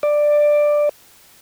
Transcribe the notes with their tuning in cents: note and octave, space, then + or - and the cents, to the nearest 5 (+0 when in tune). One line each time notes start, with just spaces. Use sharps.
D5 +10